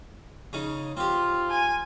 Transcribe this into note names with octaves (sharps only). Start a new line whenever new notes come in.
C#3 C#4 D#4
C4 F4 G4
G#5